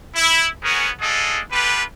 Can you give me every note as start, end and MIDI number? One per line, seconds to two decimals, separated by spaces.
0.14 0.47 64
0.63 0.89 59
0.63 0.89 61
0.63 0.89 66
0.63 0.89 68
0.63 0.89 70
1.01 1.41 62
1.01 1.41 65
1.01 1.41 68
1.01 1.41 69
1.01 1.41 75
1.52 1.83 65
1.52 1.83 67
1.52 1.83 69
1.52 1.83 71